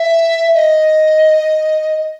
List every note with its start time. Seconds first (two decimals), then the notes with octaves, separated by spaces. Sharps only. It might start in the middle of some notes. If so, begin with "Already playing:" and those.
Already playing: E5
0.54 D#5